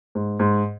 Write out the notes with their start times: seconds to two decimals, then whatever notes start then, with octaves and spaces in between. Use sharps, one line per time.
0.15 G#2
0.40 G#2